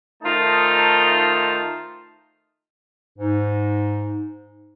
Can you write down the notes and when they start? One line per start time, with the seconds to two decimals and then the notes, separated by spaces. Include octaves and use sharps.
0.23 D#3 A3 D#4 F4 C5 A5
3.19 G#2 D#4